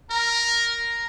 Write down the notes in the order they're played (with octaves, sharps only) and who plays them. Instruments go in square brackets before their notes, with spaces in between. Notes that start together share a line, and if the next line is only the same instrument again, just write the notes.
[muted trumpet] A#4 [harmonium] A#5